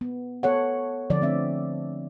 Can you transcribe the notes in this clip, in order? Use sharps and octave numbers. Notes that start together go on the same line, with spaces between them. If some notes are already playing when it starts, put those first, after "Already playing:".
B3
B3 A4 C#5 F#5
D3 F3 D5
A3 C4 E5